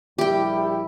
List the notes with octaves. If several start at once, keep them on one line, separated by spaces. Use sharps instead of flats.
A#1 G3 E4 G4 G5